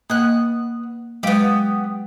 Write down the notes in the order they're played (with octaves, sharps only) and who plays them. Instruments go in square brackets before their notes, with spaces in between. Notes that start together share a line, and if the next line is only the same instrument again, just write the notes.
[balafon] A#3 D#5 [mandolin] B3 F#6
[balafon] F#3 G#3 F5 [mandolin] B3 G4